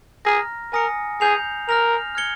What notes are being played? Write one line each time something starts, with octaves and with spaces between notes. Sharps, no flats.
G#4 A#5 F6 A#6
A#4 G#5 D#6 A#6 C#7
G#4 G6 C7 F7
A#4 F6 A#6 F7
F6 G#6 C#7 G7